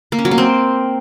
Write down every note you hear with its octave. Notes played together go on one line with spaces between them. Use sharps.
A#3
C#4
F#3
A#3
C4